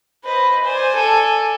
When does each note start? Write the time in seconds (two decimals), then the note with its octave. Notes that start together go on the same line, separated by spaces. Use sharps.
0.25 B4 C5 D#5
0.64 C5 D5 G#5
0.96 A4